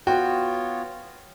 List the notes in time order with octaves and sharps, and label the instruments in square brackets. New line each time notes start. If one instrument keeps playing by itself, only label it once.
[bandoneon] B3 F4 C#5 [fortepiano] F#4 [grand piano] G5